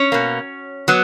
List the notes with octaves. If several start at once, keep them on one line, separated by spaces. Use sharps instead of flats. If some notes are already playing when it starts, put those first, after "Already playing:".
Already playing: C#4 C#5
B2 A#3
F#3 B3